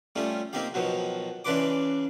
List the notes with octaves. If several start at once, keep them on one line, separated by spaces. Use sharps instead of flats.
G3 A3 C#4 F4
A#3 C4 D#4 G4 F5
B2 D#3 F3 F#3
C#3 E3 D4 B4 C6 D6